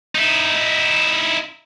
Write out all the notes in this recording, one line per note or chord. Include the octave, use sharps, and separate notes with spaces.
D#4 E4